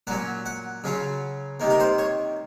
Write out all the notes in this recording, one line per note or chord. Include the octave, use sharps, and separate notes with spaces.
A#2 F#3 C#4 F#5
F#5
C#3 F#3 C#4 F4
C3 D#3 A#3
A#4
C5
C#5